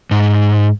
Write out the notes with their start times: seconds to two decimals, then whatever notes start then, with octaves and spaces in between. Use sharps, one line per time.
0.11 G#2